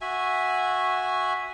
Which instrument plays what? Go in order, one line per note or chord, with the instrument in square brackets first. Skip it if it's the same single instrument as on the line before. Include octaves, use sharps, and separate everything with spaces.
[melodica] F#4 E5 G#5